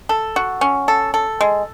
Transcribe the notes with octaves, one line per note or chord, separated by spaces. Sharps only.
A4
F#4
C#4
A4
A4
G#3